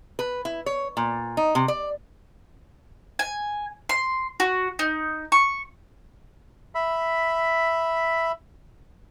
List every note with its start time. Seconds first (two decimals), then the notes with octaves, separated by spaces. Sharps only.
0.19 B4
0.45 E4
0.66 C#5
0.97 A#2
1.37 D#4
1.55 C3
1.68 D5
3.19 G#5
3.89 C6
4.40 F#4
4.79 D#4
5.32 C#6
6.75 E5 B5